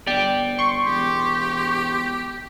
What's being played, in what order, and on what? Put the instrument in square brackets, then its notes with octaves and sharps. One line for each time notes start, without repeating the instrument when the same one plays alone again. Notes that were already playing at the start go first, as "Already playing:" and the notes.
[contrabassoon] G1 [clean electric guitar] D5 G5
[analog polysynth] C6 C#6
[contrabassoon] E1 [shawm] G4